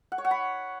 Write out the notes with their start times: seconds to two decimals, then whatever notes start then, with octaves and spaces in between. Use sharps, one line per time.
0.12 F#5
0.18 C#5
0.25 F#5
0.31 B5